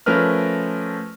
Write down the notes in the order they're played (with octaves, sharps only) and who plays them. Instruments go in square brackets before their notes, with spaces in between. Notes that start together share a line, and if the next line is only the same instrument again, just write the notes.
[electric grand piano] F3 A3 C#4 A#4 B4 F6